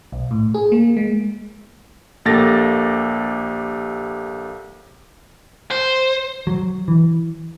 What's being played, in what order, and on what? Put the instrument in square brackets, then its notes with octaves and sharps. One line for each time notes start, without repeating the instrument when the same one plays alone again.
[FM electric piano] B1
A2
G#4
A#3
G#3
[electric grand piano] A#1 A#3 G4 A4 A6 A#6
[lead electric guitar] C5
[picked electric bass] F#3
E3